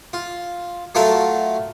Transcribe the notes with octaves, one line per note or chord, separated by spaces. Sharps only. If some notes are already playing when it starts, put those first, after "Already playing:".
F4
F#3 A3 F4 A4 A#4 E5